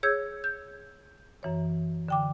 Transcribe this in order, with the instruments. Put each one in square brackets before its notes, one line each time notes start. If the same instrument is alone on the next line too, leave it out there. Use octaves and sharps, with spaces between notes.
[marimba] G#4 C#5 E6 G6 G#6
G6
F#2 E3 C#5
D3 G5 D6